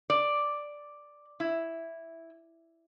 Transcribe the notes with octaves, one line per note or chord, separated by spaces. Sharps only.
D5
E4